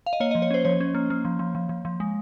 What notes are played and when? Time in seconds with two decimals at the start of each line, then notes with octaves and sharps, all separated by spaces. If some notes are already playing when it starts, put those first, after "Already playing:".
0.06 F5
0.13 D#5
0.20 A#3 C#5
0.31 D#5
0.35 F3
0.42 C#5
0.51 C#4 C5
0.65 F3 C#5
0.80 C#4
0.95 A#3
1.10 A#3
1.25 F3
1.39 F3
1.55 F3
1.69 F3
1.85 F3
2.00 G#3